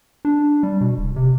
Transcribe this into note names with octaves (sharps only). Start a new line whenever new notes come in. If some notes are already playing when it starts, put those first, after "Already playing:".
D4
G3
B2
D1
C3